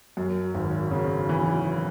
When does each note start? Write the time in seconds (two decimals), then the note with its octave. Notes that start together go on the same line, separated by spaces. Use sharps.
0.17 F#2
0.54 G#1
0.91 C#3
1.29 E3